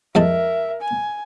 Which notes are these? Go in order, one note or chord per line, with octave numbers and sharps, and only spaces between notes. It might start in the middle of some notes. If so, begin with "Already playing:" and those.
F2 G#3 A#4 E5 A5
G#5